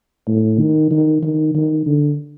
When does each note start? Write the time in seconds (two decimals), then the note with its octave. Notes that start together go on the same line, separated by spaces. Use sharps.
0.28 A2
0.59 D#3
0.91 D#3
1.22 D#3
1.55 D#3
1.86 D3